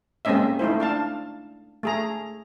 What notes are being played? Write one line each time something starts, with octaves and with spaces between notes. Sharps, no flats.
G#3 A#3 C4 C#4 D#5 E5
A3 D#4 E4 C5
D4 F5 A5
A3 G#4 A#5